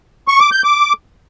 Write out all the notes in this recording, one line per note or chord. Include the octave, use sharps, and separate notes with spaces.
C#6
D6
G6
D6